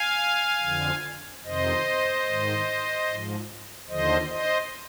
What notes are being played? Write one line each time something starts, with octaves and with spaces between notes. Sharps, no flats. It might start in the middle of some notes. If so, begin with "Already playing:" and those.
Already playing: F5 G#5
F2 D3 F3
F2 C3 D#3 C5 D#5
G#2 D#3
G#2 F3
D#2 D3 F3 C5 D#5
C5 D#5